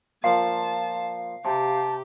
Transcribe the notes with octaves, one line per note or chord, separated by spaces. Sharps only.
A#2 F3 F5 A5
C3 G4 A5